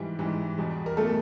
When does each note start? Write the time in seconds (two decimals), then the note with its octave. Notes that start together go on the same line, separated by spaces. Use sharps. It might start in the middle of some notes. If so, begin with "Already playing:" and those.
Already playing: G#2 E3 G3
0.19 G#2 E3 G3
0.58 E2 B2 G3
0.86 A#4
0.97 B2 G3 A3 A4